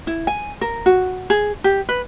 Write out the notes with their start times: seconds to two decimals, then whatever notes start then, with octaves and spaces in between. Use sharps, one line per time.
0.07 E4
0.27 G#5
0.61 A#4
0.86 F#4
1.30 G#4
1.64 G4
1.89 B4